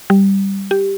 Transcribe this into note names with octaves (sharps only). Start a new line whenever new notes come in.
G3
G4